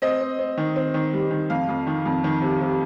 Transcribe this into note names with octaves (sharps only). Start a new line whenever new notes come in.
C4 D#5
C4
C4
D#3
C4
D#3
G3
D#3
F2 F5
F2
D#3
F2
D#3
C3
C3